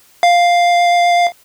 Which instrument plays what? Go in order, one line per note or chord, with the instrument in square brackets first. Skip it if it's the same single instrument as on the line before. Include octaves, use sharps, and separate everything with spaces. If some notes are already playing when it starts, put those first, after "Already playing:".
[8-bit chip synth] F5